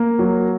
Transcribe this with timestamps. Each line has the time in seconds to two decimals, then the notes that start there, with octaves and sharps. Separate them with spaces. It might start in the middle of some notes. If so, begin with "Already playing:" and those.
Already playing: A#3
0.19 F#3